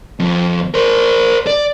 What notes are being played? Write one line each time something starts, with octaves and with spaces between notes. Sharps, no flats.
F2
A#4 C5
D5